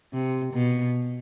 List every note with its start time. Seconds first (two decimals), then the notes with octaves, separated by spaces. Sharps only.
0.13 C3
0.54 B2